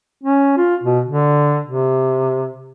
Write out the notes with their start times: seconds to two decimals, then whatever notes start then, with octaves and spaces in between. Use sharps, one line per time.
0.23 C#4
0.57 F4
0.83 B2
1.08 D3
1.67 C3